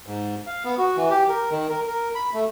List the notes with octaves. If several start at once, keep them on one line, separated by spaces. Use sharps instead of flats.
G#2
F5
B3
F#4
E3
G4
A#4
D#3
A#4
A#4
B5
A3